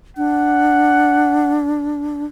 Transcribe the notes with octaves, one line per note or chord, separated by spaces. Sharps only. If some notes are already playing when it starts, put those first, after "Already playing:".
D4 F#5